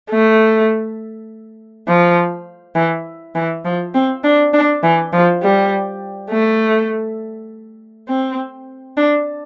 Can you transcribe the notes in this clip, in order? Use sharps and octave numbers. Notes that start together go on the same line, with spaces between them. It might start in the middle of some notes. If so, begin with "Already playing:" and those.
A3
F3
E3
E3
F3
C4
D4
D4
E3
F3
G3
A3
C4
D4